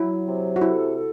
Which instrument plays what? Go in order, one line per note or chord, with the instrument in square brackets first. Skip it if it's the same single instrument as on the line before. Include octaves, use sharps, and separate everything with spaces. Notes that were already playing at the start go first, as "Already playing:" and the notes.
Already playing: [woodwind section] F#3 [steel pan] E4
[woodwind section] C3
[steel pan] F#4
[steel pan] E4 [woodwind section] A4
[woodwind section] A4